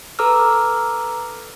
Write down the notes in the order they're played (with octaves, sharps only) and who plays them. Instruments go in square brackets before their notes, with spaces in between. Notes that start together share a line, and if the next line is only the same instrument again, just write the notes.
[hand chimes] A4 B4 A#5 D6 E6 F6